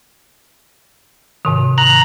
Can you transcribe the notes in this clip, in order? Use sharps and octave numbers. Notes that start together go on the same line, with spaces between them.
G#2 C3 D#3
A#5 F#6